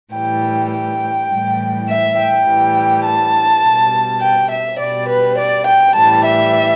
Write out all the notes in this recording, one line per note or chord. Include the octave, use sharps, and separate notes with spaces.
A2 E3 G3 G5
G5
A2 E3 G3
E5
G5
A2 E3 G3
A5
B2 G3
G5
E5
B2 G3 D5
B4
D5
G5
A2 E3 G3 A5
E5